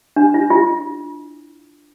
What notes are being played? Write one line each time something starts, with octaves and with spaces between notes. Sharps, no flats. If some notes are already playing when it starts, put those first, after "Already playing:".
D4
E4
F4